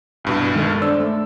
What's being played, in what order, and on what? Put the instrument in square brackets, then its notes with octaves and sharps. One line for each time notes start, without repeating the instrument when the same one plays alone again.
[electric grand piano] C2 G2 B2
[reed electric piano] D#3 F6 A6 [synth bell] G#3 A4
[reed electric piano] D4 C5 D5 [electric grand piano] E6
[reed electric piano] A3